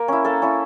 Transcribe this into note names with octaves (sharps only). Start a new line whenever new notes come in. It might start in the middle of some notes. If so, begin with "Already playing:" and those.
Already playing: A#3 A#4
C#4 E4
A#3 A4
C#4 E4